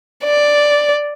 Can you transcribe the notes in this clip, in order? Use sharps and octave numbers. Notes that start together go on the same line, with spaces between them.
D5